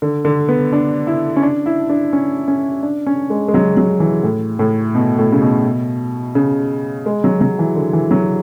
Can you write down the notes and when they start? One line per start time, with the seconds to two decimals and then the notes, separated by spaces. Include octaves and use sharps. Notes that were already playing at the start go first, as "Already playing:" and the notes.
0.02 D3
0.25 D3
0.49 B3
0.72 D4
1.07 E4
1.37 C#4
1.42 D4
1.66 E4
1.90 D4
2.13 C#4
2.48 C#4
2.83 D4
3.07 C#4
3.30 G#3
3.48 G#3
3.54 F#3
3.77 F#3
4.00 E3
4.23 A2
4.59 A2
4.95 B2
5.19 A2
5.32 C#3
5.42 B2
6.35 C#3
7.06 G#3
7.24 F#3
7.41 F#3
7.59 E3
7.76 D3
7.93 E3
8.11 F#3